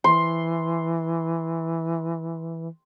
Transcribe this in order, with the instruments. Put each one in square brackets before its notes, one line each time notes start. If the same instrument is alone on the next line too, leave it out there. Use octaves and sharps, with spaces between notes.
[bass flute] E3 [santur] C6